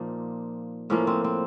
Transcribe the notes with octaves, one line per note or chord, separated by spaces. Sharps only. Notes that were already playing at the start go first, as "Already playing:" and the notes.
Already playing: A#2 F3 A#3 D#4
A2 F3 A#3 C#4
C4
C4